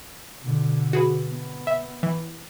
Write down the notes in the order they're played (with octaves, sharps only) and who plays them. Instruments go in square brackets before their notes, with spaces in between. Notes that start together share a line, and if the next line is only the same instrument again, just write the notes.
[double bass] B2 D3
[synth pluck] F#4 G#4 B4
[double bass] B3
[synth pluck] E5
E3